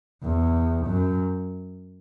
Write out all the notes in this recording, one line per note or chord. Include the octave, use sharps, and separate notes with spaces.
E2
F#2